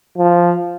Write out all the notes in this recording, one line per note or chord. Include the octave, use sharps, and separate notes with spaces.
F3